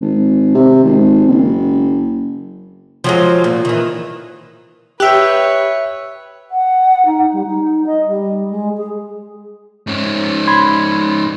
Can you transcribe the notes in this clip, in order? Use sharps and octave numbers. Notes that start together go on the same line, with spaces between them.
G#1
C3
G#1
F#1
F3 F#3 G#3
A#2
D#3 E3
G4 B4 C#5 E5 G5 F#6
F#5
D#4
G3
D#4
D#5
G3
G#3
G#4
G#2 C#4
B5 C6 G#6